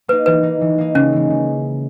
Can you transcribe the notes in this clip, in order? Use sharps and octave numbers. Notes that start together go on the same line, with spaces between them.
A#3 D#4 B4
E3 B4
A#3 D#4
E3
A#3 D#4
C#3 C#4
E3 G#3
C#3